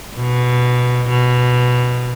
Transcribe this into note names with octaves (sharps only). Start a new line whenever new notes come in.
B2
B2